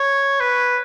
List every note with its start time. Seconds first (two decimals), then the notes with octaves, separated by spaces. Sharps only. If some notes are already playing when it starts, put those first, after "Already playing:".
Already playing: C#5
0.40 B4